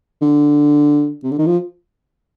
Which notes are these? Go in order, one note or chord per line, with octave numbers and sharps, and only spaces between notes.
D3
C3
D3
D#3
F3